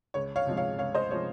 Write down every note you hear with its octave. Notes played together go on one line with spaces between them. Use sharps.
C#2 C#5
C#5 F5
C3 F3 G#3
C#5 F5
C#2 C#5 F5
C5 D#5
C3 F3 G#3 C#5